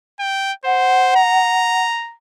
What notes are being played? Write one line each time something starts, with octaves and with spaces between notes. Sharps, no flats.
G5
C5 F#5
A#5